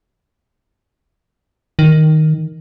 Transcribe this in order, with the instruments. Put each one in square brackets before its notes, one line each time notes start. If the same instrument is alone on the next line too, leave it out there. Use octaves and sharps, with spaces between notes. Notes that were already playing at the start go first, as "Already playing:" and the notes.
[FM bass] D#3